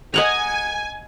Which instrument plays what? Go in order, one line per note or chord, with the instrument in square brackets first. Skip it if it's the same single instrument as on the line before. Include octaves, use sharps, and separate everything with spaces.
[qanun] D#5 F#5 A#5 [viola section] G#5